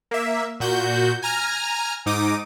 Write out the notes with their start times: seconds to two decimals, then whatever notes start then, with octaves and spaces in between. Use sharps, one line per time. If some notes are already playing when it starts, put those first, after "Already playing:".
0.11 A#3 E5
0.60 A#2 F#4 G6
1.22 G#5 A#5 F6
2.06 G#2 D#4 D6 D#6